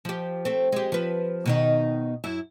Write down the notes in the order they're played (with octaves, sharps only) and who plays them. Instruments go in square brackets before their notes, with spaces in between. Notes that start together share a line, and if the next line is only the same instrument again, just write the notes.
[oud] F3 G4
A3 C4
G#3 G4
F3 B4
B2 D#3 D#4
F#2 E4